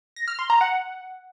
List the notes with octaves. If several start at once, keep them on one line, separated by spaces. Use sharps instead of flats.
A#6
F6
C6
A#5
F#5